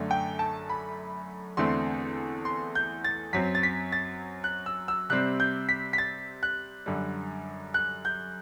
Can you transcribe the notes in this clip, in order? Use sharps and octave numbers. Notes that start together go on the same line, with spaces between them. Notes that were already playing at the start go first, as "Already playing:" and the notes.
Already playing: F#2 D3 A3
G5
A5
B5
E2 D3 A3 C4 C6
C6
G6
A6
F#2 F#3 C4 B6
A6
B6
A6
F#6
E6
E6
C3 G3 C4 F#6
G6
B6
B6
A6
F#6
F#2 D3 G3
F#6
G6